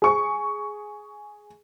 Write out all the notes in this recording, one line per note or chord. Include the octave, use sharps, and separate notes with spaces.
G#4 C#6